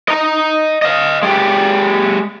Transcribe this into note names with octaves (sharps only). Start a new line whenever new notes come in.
D#5 A#5
D#5 F5
G#3 G4